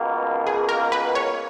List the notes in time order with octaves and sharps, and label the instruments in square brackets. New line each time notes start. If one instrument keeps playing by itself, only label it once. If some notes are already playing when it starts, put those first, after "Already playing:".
Already playing: [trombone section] C#2 B2 A#3
[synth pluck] G#4
A#4
B4
C#5